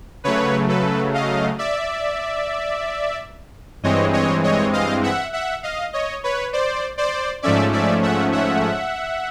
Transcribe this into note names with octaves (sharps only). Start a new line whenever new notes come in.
C#3 F#3 A3 B4 C#5
A4 B4
D#5 F5
D5 E5
G2 E3 G#3 C4 C#5 D#5
C#5 D#5
C#5 D#5
D#5 F5
E5 F#5
E5 F#5
D#5 F5
C#5 D#5
B4 C#5
C5 D5
C5 D5
G#2 F3 A3 C#4 D5 E5
D5 E5
E5 F#5
E5 F#5